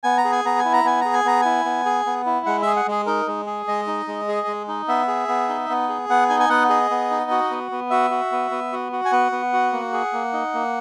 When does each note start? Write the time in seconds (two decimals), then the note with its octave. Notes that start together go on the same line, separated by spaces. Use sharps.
0.04 B3 G#5
0.18 A#5
0.25 G#4
0.32 G#5
0.45 B3 A#5
0.59 G#5
0.65 E4
0.73 A#5
0.84 B3 G#5
1.01 G#4 A#5
1.14 G#5
1.25 B3 A#5
1.41 E4 G#5
1.65 B3
1.86 G#4
2.06 B3
2.26 E4
2.46 G#3 F#5
2.62 G#4 E5
2.76 F#5
2.87 G#3 G#4
3.06 D#4 A#4
3.27 G#3
3.47 G#4
3.68 G#3 D#5
3.87 D#4
4.07 G#3
4.28 G#4
4.47 G#3
4.68 D#4
4.88 B3 E5
5.08 G#4
5.28 B3
5.49 D#4
5.70 B3
5.89 G#4
6.09 B3 F#5
6.29 D#4 G#5
6.40 G#5
6.49 B3 F#5
6.69 G#4 D#5
6.91 B3
7.10 D#4
7.31 F#4
7.51 B3
7.71 B3
7.90 F#4 E5
8.11 F#4
8.32 B3
8.51 B3
8.72 F#4
8.92 F#4
9.05 G#5
9.12 B3 F#5
9.32 B3
9.53 F#4
9.72 A#3
9.93 G#4
10.13 A#3
10.33 D#4
10.54 A#3